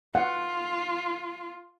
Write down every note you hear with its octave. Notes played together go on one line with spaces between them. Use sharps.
F4 F#5